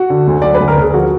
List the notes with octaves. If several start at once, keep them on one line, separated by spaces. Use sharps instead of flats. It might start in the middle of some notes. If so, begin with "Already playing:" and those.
Already playing: F#4
D3
D2
F#3 D5
B4
D2
A#4
D2 G#4
F3 F#4